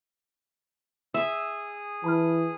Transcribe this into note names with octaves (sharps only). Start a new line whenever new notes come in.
G#4 E5 D#6
E3 A5 B5 F6